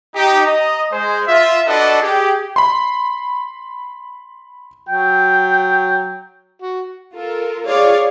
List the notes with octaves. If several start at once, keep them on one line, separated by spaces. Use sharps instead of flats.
D#4 G4
D#5 A#5
G#3 G#4 C5
F4 E5
D4 F#4 A4 B4 D5 D#5
G4 G#4
B5 C6
F#3 G5
F#4
F4 A4 A#4
F4 G#4 C#5 D5 F5